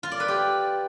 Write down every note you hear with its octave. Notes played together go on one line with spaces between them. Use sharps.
F4
D5
B4
G4